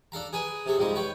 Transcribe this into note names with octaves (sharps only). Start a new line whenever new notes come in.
D4 A4 F5 A#5
G#4 A#4 B4 G#5
C3 G#4 A4
F2 G#2 G3 G#3 A#5
B4 C#5 G5